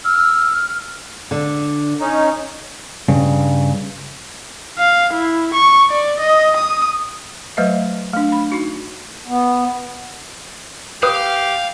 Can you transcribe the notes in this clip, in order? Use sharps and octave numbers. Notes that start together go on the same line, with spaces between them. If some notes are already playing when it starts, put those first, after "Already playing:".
E6 F6
D3
C#4 D#4
G2 C#3
F5
E4
C#6
D5
D#5
D#6
F#3 A3 B4 C5 D#5 E5
A3 D4
B5
D#4 F#4
B3
G4 B4 F5 D#6